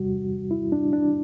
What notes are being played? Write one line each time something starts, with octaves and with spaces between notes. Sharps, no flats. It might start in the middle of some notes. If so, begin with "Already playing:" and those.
Already playing: E2 C3 G3 F#4
E4
D4
D4